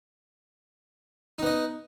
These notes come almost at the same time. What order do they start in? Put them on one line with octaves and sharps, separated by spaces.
D#4 B3 D#5